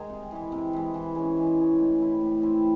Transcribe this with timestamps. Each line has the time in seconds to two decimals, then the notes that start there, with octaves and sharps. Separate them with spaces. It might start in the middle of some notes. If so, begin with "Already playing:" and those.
Already playing: D#3 G#3 D#4 G#4
0.09 C3
0.31 E3 G#3
0.52 C3
0.73 E3 G#3
0.94 E3
1.15 G#3 C#4
1.37 E3
1.57 G#3 C#4
1.79 A2
2.00 E3 C4 E4
2.21 A2
2.42 E3 C4 E4